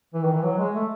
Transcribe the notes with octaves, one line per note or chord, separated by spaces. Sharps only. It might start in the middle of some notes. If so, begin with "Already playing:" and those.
E3
D#3
E3
F#3
G#3
A3